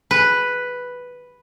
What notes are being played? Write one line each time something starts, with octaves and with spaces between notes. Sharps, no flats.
B4